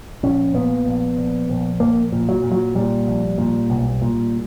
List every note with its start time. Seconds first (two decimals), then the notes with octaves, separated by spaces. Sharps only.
0.23 A#1 C#4
0.54 A#2 B3
0.86 A#1
1.17 A#1
1.50 A#1
1.80 A#1 A#3
2.12 A#2
2.29 F#3
2.44 A#2
2.52 F#3
2.75 A#2 G3
3.08 A#1
3.38 A#2
3.70 B1
4.02 A#2